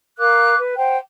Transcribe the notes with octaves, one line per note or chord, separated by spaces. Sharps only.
A#4 F5 D6 F#6
B4
C5 F#5 G5